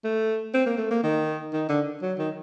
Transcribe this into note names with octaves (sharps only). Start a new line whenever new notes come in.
A3
C4
A#3
A3
A#3
D#3
D#3
D3
F#3
D#3